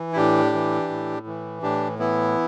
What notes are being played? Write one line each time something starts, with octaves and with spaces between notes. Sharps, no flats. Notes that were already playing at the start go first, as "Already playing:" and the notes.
Already playing: E3
E4
A2 D4 G4
E3
A2
E3
A2 D4 G4
E3 B3 E4